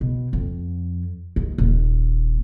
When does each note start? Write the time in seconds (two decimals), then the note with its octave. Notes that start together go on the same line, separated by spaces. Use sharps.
0.01 B2
0.33 F2
1.36 D#2
1.58 D#1